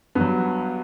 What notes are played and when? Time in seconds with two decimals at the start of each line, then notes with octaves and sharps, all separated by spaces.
0.15 G2 B3
0.21 F#3